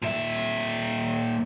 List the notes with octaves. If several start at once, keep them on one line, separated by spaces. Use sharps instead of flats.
A#2 E5